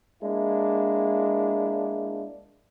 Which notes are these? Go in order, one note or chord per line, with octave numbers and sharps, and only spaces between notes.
G#3 A#3 D4 E4